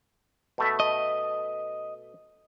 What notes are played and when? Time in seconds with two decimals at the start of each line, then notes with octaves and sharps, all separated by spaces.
0.58 B2 A3 E5
0.80 D#5